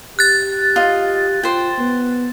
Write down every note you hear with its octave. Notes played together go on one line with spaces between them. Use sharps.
G4 F#6 A6
F4 D#5
F4 C5 G5
B3